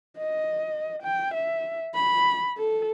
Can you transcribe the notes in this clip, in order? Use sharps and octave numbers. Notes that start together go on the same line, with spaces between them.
D#5
G5
E5
B5
A4